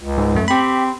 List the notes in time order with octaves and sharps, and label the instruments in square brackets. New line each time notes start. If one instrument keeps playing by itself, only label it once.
[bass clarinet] C#2
[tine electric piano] G#2
F#2 A3
[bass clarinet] C4 [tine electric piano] G4 B5